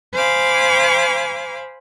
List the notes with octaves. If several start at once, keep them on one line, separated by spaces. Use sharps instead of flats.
C5 F5 G#5 B5 D6